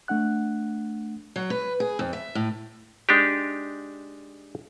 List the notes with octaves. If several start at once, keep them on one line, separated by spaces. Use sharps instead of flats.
A3 D4 F#5 F#6
F#3
B4
G#4
F2
E5
A2
G#3 D4 D#4 G4